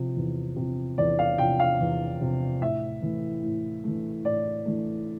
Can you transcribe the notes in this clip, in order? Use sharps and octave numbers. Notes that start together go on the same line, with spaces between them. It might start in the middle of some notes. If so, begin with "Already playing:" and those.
Already playing: C3 F3
E2
C3 F3
E2 D5
F5
C3 F3 G5
F5
E2
C3 F3
A2 E5
E3 A3
A2
E3 A3
A2 D5
E3 A3